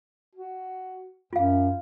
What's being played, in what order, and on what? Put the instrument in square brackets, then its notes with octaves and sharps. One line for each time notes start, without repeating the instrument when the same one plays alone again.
[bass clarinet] F#4
[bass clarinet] F#2 [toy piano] F4 F5